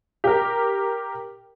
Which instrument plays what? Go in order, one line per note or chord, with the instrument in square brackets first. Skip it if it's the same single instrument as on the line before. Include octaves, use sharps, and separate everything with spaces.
[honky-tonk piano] G4 A#4